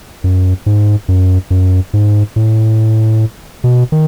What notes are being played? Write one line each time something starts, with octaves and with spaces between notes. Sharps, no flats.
F#2
G#2
F#2
F#2
G#2
A2
B2
D#3